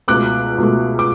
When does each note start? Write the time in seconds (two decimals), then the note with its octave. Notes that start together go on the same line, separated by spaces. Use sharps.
0.08 C#2 B2 A3 D6 F#6
0.58 C#2 B2 A3
0.99 D6